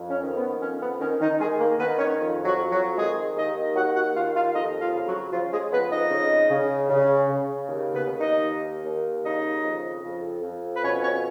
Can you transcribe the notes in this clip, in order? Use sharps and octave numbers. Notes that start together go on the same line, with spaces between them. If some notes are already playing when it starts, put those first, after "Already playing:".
Already playing: F2
C#4
D#3
B3
F2 C#4
B3
D#3 C#4
D#3 D#4
D#3 G#3 G#4
A#3 A#4
D#3 B3 B4
C#4 C#5
F2
F#3 F#4
F2
F#3 F#4
D#3 G#3 G#4
D#2 D#4 D#5
D#3 F#4 F#5
F#4 F#5
D#2 F4 F5
F4 F5
F2 D#4 D#5
F4 F5
C#3
F#3 F#4
C#3 F3 F4
G#3 G#4
F2 B3 B4
D#4 D#5
C#3
C#3
C#3
C#3
D#2
B3 B4
D#2
D#4 D#5
D#3
D#2
C#3 D#4 D#5
F2
F2
F2
B4
B2 C#4 C#5
C#4 C#5